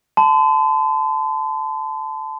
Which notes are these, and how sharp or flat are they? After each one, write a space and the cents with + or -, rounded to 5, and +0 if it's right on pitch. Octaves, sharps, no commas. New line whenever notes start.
A5 -10 C6 -45